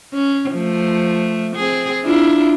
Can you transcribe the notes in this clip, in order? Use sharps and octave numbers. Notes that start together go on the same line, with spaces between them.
C#4
F3 A3
C4 G#4
D4 E4 F4